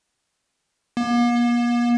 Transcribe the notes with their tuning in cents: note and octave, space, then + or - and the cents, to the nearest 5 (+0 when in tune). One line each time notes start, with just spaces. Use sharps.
A#3 +45